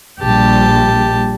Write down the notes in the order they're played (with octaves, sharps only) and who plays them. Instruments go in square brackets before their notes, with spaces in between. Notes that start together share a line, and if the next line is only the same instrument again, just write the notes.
[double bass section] A#1 G3 [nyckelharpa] G4 A5